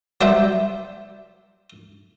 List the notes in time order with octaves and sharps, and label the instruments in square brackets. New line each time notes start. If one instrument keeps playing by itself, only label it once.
[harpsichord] F#3 G3 G4 C5 E5